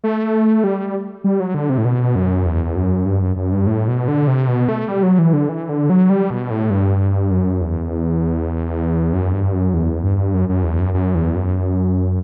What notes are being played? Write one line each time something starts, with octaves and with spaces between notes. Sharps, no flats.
A3
G3
G3
F#3
D3
C3
A2
B2
F#2
E2
F#2
G2
F#2
F#2
G2
A2
B2
D3
C3
B2
A3
G3
F#3
E3
D3
E3
D3
F#3
G3
B2
A2
G2
F#2
E2
F#2
G2
F#2
E2
G2
F#2
F#2
E2
F#2
F#2
E2
F#2